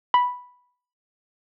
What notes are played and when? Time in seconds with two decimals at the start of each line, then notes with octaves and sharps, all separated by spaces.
0.14 B5